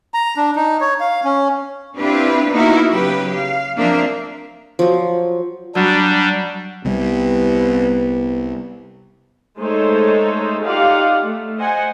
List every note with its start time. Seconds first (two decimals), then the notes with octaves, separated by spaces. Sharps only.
0.14 A#5
0.37 D4
0.56 D#4
0.81 C#5
1.00 F5
1.24 C#4
1.96 C4 D4 E4 F4 G4 B4
2.52 A#3 B3 D#4 E4 F#4 A#4
2.90 C#3 F#3 G4 B4
3.34 F5
3.77 F3 A#3 C4 D4 A#4 E5
4.79 F3 F#3
5.75 F#3 G3 D4
6.85 C2 G3 B3
9.58 G#3 A3 D#4 A4 C5 C#5
10.62 D#4 F4 G4 D5 F5 F#5
11.24 A3
11.57 C5 D#5 F#5 G#5